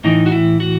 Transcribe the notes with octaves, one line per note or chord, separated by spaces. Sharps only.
A2 E3 D#4
F#4
E4
F#4